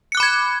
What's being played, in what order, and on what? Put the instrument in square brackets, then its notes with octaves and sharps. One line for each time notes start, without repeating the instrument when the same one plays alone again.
[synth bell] C#7
F#6
D6
B5
G#6